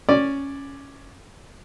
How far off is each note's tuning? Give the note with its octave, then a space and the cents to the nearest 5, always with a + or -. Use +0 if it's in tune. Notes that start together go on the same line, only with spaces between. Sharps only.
C#4 +0 D5 +0